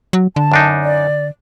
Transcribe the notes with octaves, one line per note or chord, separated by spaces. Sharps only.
F#3
D3 A5
F#2 D4 D#4
D5